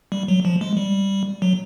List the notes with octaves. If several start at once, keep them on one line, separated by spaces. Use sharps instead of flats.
G3
F#3
F3
G#3
G3
F#3